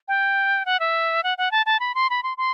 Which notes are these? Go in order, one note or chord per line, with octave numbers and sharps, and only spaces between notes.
G5
F#5
E5
F#5
F#5
A5
A5
B5
C6
B5
C6
C6